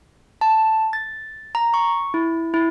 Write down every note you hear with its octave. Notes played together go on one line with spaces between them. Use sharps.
A5
A6
A#5
C#6
E4
E4